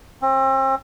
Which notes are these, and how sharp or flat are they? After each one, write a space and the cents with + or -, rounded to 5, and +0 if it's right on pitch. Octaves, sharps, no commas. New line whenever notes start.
C4 +35